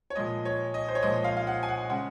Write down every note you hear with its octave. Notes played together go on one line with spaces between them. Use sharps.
C#5
A#2 F3 G#3 D#5
C#5
D#5
C5
C#5
A#2 F3 G#3 D#5
F5
F5
F#5
G#5
F#5
C#3 G#3 F#5